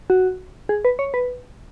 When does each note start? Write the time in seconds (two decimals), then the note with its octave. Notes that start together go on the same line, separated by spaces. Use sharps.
0.10 F#4
0.69 G#4
0.85 B4
0.99 C#5
1.14 B4